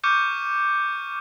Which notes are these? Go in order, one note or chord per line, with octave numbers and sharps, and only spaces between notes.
C#6 D6 F6 G6 C#7 D#7